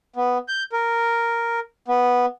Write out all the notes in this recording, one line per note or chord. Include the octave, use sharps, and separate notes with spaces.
B3
G6
A#4
B3